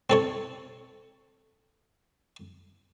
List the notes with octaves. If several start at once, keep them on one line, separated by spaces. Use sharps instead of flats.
C4 A4 C#5